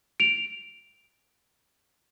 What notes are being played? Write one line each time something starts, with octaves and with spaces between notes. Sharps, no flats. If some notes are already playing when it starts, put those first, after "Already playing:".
D7 F7